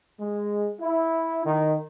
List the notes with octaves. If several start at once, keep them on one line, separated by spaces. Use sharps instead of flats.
G#3
E4
D#3